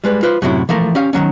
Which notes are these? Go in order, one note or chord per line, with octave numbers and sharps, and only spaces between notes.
G3 G#3 B4
F4 B4 C5
F#2 A2 C3 F#3 E4
E3 F3 A3 A#4
C#4 G4 F5
D#3 E3 F#3 C#4